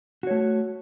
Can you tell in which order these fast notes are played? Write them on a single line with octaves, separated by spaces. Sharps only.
F#4 C#5 A3